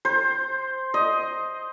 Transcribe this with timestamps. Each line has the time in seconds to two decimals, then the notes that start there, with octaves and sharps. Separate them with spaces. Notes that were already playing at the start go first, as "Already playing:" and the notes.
0.05 C5
0.94 D#5